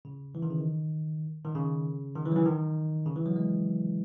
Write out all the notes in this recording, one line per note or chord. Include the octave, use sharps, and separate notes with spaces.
C#3
E3
D#3
C#3
D#3
D#3
C#3
D#3
E3
F#3
E3
D#3
C#3
E3
F#3
G#3